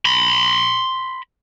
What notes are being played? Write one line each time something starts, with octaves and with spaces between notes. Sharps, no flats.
B5 C6